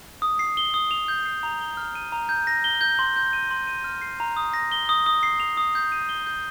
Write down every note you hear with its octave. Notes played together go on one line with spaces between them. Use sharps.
D#6
C7
G7
D#6
F7
G6
C7
A#5
G7
F6
D#7
A#5
G6
A#6
G7
G6
C6
G6
D#7
C6
D#7
F6
C7
A#5
D#6
A#6
G7
D#6
D#6
C7
F7
D#6
G6
D#7
G7
G6